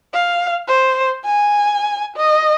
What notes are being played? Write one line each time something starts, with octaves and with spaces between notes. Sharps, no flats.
F5
C5
G#5
D#5